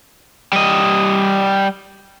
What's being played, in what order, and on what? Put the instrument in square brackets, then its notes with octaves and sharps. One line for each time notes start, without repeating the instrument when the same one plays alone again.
[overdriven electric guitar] G3 D#5